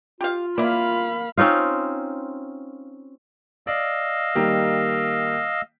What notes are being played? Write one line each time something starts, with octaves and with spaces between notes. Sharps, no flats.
F4 G4 F5
A#3 E4 D5 F5 B5
C4 C#4 D#4 F4
D5 D#5 F5 E6
D#3 G3 A#3